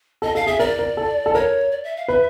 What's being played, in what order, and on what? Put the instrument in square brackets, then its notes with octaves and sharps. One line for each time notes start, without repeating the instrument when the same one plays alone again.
[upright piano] A4 [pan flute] D#5
[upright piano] A4 [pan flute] F5
[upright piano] G#4 [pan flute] E5
[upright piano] A#4 [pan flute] D5
[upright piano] A#4
A4
A4
[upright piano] A#4 [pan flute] C#5
[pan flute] D5
E5
F5
[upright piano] B4 [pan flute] E5